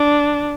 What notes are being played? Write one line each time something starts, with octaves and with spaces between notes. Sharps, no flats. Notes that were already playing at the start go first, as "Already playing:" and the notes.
Already playing: D4